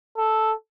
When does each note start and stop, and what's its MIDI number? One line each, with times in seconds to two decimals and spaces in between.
0.18 0.53 69